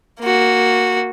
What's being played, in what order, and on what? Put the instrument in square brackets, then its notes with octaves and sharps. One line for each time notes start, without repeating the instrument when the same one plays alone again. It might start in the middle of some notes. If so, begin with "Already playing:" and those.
[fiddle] A#3 F#4